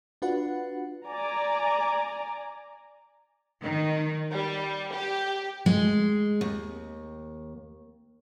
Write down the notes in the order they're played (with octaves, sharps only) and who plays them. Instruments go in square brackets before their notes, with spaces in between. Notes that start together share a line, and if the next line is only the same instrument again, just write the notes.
[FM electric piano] D4 F4 F#4 B4 F#5
[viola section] D5 G#5 A#5
[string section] D#3
G3
G4
[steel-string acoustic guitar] G#3
D#2